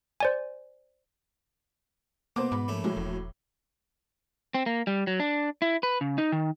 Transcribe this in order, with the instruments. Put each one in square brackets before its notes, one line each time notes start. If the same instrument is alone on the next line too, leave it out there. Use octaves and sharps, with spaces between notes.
[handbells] C5 D5 G#5
[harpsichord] B2 B3 [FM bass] A#3 [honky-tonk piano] C5 D6
[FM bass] G#2 [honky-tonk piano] B5
[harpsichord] A#1 A3 C#4
[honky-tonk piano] A2 F#3 [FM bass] G#3
[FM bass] E1
[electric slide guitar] C4
A#3
G3
F#3
D4
E4
B4
C#3
D#4
D#3